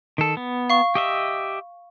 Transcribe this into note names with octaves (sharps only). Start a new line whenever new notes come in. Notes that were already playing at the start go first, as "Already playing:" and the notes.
D#3 A4
B3
F5 C#6
G4 D#5 E5